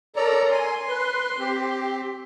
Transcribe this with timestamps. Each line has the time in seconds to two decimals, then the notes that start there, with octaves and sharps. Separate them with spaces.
0.16 A4 A#4 C#5 D5 A#5
0.51 G#5 C6
0.88 B4
1.39 C4 G4